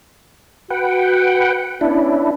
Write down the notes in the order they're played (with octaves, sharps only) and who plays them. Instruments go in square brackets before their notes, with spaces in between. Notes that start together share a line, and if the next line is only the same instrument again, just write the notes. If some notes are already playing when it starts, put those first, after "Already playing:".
[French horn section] F#4 [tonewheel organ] B4 F#5 G5
[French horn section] B3 C#4 [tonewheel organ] D4 E4